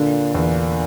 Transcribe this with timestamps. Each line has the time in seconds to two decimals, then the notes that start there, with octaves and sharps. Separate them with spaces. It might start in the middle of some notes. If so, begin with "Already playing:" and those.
Already playing: A#2 D3
0.35 E2 A#2